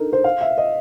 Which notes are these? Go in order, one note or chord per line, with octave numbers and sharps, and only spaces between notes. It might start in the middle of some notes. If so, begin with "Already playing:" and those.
Already playing: D4 D#4 A4 A#4
C5
F5
E5
D#5